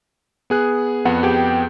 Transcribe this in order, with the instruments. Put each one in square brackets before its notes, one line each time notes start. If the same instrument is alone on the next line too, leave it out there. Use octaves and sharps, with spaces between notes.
[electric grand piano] B3 G#4 F#6
[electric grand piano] F2 B3 [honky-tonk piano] F#5
[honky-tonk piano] G4 G#4 G5